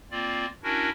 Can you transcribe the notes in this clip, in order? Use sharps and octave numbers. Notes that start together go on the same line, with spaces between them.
A#3 C4 F4 D5
C#4 D4 E4 F#4 A#4